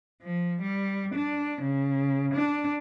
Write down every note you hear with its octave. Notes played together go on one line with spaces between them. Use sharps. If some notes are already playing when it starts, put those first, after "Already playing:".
F3
G3
D4
C#3
D4